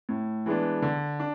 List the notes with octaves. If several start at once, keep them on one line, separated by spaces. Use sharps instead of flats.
A2
E3 G#3 B3 D4
D3
D4